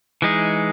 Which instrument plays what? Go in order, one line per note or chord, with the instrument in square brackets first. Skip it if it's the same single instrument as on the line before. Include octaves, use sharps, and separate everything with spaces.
[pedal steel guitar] E3 G#3 D#4 G#4